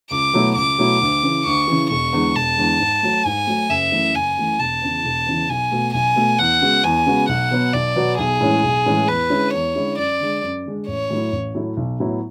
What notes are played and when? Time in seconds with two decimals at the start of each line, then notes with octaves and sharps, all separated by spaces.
0.11 C#2 D6
0.33 B2 F#3 A3 E4
0.56 C#2 D6
0.78 B2 F#3 A3 E4
1.01 D2
1.23 C#3 E3
1.45 D2 C#6
1.68 C#3 E3
1.90 E1 C#6
2.13 E2 D3 G#3
2.35 E1 A5
2.57 E2 D3 G#3
2.79 G#2
3.03 F#3 A3
3.25 G#2 G#5
3.47 F#3 A3
3.69 F#1 E5
3.92 F#2 E3 A3
4.15 F#1 G#5
4.37 F#2 E3 A3
4.59 E1 A5
4.82 E2 C#3 E3
5.05 E1
5.26 E2 C#3 E3
5.49 B1 G#5
5.72 B2 A3
5.94 B1 G#5
6.16 B2 A3
6.38 E2 F#5
6.61 C#3 G#3 B3 F#4
6.83 E2 G#5
7.06 C#3 G#3 B3 F#4
7.29 B1 F#5
7.51 B2 F#3 B3
7.73 B1 D5
7.96 B2 F#3 B3
8.18 B1 G#4
8.41 A2 E3 G#3 C#4
8.63 B1
8.86 A2 E3 G#3 C#4
9.08 E2 B4
9.30 D3 G#3 C#4 E4
9.53 E2 C#5
9.76 D3 G#3 C#4 E4
9.97 F#2 D5
10.20 D3 G#3 D4
10.42 F#2
10.66 D3 G#3 D4
10.88 A1 C#5
11.10 A2 F#3 A3 E4
11.32 A1
11.55 A2 F#3 A3 E4
11.77 B1
12.00 A2 F#3 B3 E4